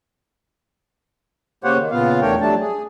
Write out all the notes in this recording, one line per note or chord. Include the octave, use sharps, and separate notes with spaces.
C#3 A#3 G4 C5 C#5 F#5
D#3
A#2 C#3 B3 F4 F5
E2 A3 D4 A#4 C#5 G5
F2 F#3 G3 A3 D4 A5
G#4